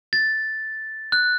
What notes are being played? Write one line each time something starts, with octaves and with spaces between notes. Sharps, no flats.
A6
F#6